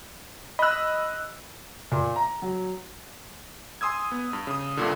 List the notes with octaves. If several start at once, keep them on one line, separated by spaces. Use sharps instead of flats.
D#5 B5 E6 F#6
A#2
A#5
F#3
G#5 C6 D#6 E6 G#6
B3
G2
C#3 D#6
C2 G2 A#2 D3